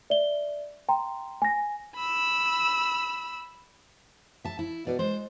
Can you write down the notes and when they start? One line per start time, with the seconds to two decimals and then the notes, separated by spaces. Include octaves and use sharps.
0.10 D5 E5 G7
0.89 G5 A#5 C6
1.42 G#5 A#6
1.96 B5 E6
4.45 E5 A5
4.59 E4
4.87 B2 D5
4.99 G#3 C5